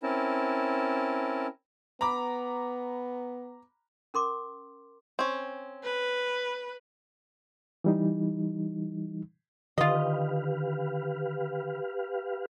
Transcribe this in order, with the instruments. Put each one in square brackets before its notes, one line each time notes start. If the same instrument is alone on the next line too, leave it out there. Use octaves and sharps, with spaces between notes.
[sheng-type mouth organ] C4 C#4 E4 A#4 A5
[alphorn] B3 [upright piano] A#5 B5 D6
[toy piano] C#4 A#4 C6 D6
[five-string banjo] C4 C#4
[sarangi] B4
[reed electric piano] E3 G3 D#4
[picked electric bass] D3 D#3 [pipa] F4 D#5 [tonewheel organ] G4 B4 F5